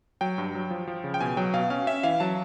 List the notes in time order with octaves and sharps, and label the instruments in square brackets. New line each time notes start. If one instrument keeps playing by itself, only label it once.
[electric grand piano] F#3 G5
G2
F#3
F3
F3
C#3
G5
B2 G#5
F#3 G5
B2 F5
C#4 F5
C#4 E5
E3 F5
F#3 A5